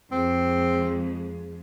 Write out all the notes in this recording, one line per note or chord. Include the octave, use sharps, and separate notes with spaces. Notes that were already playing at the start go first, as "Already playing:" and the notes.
F2 G#3 C4